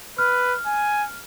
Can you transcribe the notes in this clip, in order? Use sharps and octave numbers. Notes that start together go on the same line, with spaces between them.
B4 F6
G#5